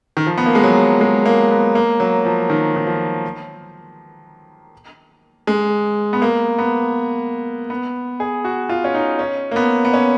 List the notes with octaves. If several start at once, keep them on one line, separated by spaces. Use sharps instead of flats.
D#3
F3
B3
A#3
G#3
F#3
G#3
A#3
B3
A#3
F#3
F3
D#3
D#3
F3
G#3
B3
A#3
B3
B3
G#4
F#4
F4
C#4
D#4
C#4
A#3
B3
B3
C#4